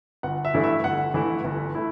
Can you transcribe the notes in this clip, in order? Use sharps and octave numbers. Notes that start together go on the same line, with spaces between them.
G1 F#5
E5
G2 E3 A3 E4
E5
G1 F#5
G2 E3 A3 E4
G1
A3 E4